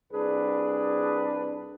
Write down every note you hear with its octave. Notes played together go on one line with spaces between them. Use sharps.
C2 D4 G#4 B4